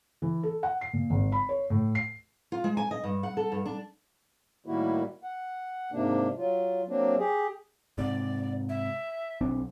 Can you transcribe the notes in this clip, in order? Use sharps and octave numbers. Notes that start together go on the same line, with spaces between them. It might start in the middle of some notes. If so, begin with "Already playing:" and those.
E3
A4
F#5
C7
A#2
G#1
B5
C#5
A2
C7
F4
G#3
G#5
D#5
G2
F#5
A4
G2
D4
A2 D#3 G3 A#3 E4 F#4
F#5
G#2 C3 A#3 D4
F#3 F4
F#3 A#3 C4 D4
G4 G#4
G#2 C3 D5
E5
B1 C4 D4